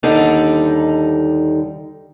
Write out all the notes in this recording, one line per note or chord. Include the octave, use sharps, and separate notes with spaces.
D#2 D3 G3 D#4 A4